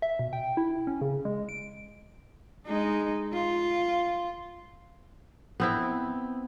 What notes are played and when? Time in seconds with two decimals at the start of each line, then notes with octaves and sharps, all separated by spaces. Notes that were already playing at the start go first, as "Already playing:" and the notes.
0.02 E5
0.19 B2
0.33 G5
0.57 E4
0.87 C#4
1.01 C#3
1.25 G#3
1.49 D7
2.66 G#3 D#4
3.33 F4
5.60 B3 C4 E4